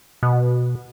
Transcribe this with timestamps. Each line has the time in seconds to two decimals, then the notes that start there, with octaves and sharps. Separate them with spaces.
0.23 B2